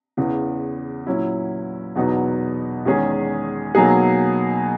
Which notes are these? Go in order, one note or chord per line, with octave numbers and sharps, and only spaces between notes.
E2 C#3 E3
A#2 F#3 C#4 E4
E2 B2 F#3 B3 D#4
E2 D#3 G#3 C#4 G#4
B2 F#3 A#3 D#4 G#4